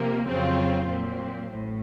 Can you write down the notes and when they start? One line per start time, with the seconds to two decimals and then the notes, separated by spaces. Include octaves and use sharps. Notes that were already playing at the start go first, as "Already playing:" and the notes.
Already playing: C3 F3 A#3
0.26 F2 C#3 F#3 C4 F4
0.88 A#2 F#3 C4
1.52 A1 A2